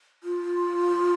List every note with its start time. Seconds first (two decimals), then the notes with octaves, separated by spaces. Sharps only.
0.24 F4